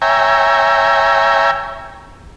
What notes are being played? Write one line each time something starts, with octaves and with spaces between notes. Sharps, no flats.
C#5 E5 G5 G#5 A#5